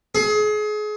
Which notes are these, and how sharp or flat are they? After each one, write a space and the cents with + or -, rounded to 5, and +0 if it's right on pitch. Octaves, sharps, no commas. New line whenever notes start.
G#4 +30